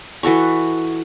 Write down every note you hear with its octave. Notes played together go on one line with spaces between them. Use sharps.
E3 F#4 A4 C#6